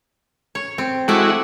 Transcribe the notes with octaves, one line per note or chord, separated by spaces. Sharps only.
C#5
C4
G#3 A3 E4 F#4 D5 F#5